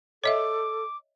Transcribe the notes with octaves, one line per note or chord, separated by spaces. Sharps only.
A4 C#5 D#5 E5 D6